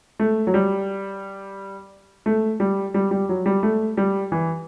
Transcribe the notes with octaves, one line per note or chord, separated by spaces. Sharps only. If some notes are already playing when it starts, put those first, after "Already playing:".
A3
F#3
G3
A3
G3
G3
G3
F#3
G3
A3
G3
E3